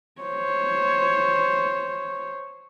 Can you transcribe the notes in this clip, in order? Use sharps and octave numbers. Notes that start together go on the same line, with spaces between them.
C5 C#5